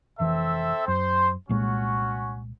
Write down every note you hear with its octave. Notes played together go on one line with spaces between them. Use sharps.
F1 E3 C4 A4 E5
F#2 C5
C2 A#2 G#3 C#4 F#4